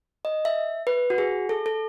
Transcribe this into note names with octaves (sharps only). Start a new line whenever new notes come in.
D#5
E5
B4
F#4
G#4
A4
A4